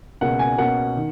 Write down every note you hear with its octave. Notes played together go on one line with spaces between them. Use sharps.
C#2 B2 A#3 C#4 F#5
G#5
B2 A#3 C#4 F#5
D#3